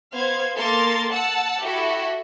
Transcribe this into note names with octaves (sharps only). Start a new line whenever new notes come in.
B3 C5 F5 G#6
A#3 A4 A#4 C6 A6
F#5 A5 E6
E4 F#4 G4 A4 E5